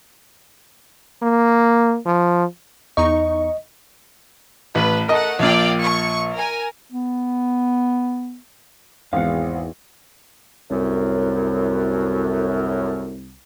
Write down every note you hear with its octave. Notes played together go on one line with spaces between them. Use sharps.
A#3
F3
E2 D#4 D#5 C#6
A1 B4
A3 A#4 D#5 F#5
A#1 A#2 D5 F5 G5
C#6
A#4 G#5
B3
G#1 E2 F5 F#5
C2 F#2 A2